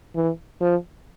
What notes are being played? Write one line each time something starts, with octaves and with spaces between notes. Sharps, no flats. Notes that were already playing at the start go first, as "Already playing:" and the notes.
E3
F3